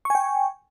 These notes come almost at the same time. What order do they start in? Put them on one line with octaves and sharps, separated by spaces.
C#6 G#5 G5